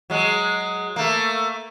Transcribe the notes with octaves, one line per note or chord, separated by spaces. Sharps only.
F#3 G#3
A3 A#3